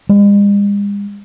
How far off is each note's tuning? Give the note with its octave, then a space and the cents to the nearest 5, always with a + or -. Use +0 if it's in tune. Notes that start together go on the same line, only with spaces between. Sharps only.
G#3 -45